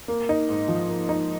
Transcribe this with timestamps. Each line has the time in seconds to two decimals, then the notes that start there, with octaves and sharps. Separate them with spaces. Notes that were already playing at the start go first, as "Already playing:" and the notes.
0.08 A#3
0.29 D#4
0.49 G#2
0.68 F3
0.89 A#3
1.09 D#4